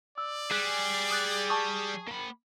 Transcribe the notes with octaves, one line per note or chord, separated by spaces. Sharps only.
D5 E6
G3 G#4 F#6 B6 E7
D#6 F#6 A6
A5 C#6 D#6
A#3 B5